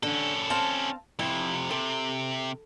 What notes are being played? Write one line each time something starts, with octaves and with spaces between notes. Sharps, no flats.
D3 C#4 A4
C4 F5 A5
F2 C3 E4
C3 A4